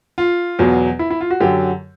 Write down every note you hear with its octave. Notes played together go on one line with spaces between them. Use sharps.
F4
E2 B2 F#3
E4
E4
F4
F#4
F#2 D3 F#3 G4